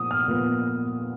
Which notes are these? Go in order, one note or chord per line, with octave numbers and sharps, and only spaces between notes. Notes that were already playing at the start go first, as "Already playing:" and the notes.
Already playing: A#2 F3 B3 D#6
F6
A#2 F3 B3